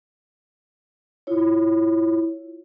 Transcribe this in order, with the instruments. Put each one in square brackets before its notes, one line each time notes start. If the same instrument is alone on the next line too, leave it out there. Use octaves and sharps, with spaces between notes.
[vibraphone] E4 F4 C#5